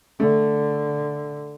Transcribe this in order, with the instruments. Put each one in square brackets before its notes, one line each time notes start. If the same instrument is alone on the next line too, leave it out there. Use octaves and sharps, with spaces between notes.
[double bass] D3 [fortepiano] A3